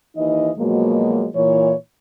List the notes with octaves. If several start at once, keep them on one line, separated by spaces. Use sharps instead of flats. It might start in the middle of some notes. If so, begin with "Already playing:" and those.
D#2 E3 D#4 D#5
B2 F3 F#3 G#3 A#3
A#2 E3 C#5